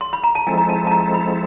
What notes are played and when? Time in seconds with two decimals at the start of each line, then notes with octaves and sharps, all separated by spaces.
0.01 C6
0.13 B5
0.24 A#5
0.35 A5
0.47 F3 G#3 C4 E4 A4 G#5
0.58 A#5
0.69 A5
0.87 A5
0.91 A#5
1.14 B5